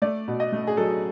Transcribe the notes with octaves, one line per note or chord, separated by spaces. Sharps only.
A3 D5
B2
D#5
A3
G#4
F#3 A4